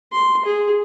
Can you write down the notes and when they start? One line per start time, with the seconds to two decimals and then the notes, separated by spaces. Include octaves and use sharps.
0.12 C6
0.45 G#4